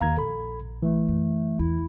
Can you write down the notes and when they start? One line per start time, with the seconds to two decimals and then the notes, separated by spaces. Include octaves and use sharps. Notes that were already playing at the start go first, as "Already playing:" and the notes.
0.01 D#2 F5 A#5 G#6
0.17 A#1 A4 B5
0.82 E3 A3
1.08 F#2
1.59 E2 E4